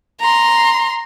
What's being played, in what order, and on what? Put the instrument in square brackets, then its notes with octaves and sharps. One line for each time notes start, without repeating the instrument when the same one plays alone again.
[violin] A#5 C6